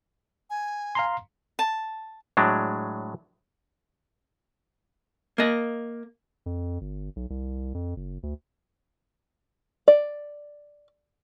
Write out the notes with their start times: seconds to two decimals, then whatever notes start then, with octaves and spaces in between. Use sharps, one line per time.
0.50 G#5
0.95 F5 A#5 C6
1.59 A5
2.37 A2 F#3 G#3 D4
5.38 A#3 D#5
6.46 F2
6.81 G1
7.16 B1
7.30 C2
7.74 F2
7.96 F#1
8.23 D2
9.88 D5